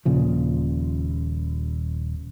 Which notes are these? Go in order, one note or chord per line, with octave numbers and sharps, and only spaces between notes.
D#1 A#2 C#3 F3